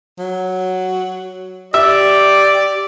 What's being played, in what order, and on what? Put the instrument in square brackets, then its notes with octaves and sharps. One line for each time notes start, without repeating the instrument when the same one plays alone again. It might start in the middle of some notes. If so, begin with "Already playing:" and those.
[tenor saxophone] F#3
[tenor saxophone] G4 [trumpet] D5 [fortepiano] E5